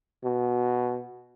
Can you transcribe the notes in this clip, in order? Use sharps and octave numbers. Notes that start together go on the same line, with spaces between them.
B2